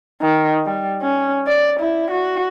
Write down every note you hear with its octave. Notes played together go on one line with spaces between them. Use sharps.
D#3
G3
C#4
D5
E4
F#4